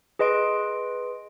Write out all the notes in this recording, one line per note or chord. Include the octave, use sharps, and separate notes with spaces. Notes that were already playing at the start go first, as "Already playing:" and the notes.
G#4 B4 D#5 C6 D7